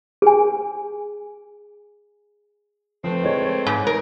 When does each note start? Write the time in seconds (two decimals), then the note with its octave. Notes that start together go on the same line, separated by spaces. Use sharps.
0.22 G#4 G#5
3.04 F3 A3 C4 B4
3.23 G#3 C#5
3.67 G#2
3.87 A#4